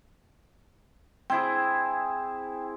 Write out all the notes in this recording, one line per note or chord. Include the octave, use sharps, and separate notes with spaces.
C4 E4 G#4 G5